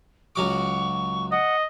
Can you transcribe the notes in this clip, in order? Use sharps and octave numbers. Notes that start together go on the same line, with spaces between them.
C#2 F#3 C#6 D6
D#5 F#5